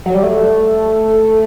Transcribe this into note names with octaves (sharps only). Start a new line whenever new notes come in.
F#3
G3
A3